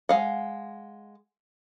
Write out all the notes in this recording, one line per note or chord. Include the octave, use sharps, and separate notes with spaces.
G#3 F5 F#5